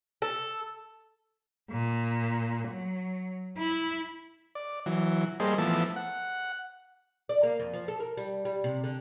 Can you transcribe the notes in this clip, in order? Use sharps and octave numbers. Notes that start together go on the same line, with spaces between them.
A4
A#2
F#3
E4
D5
E3 F#3
G3 A#3 G#4 A4 C5 D#5
E3 F3 A3 B3 A5 E6
F#5
D5
A#3
F2
F3
A4
A#4
G3
G3
C3
D3